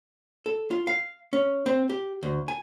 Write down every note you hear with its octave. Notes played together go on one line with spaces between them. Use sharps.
A4
F4
F5
C#4
C4
G4
D2
G#5